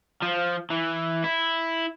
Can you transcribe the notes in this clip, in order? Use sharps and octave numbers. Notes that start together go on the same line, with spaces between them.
F3
E3
E4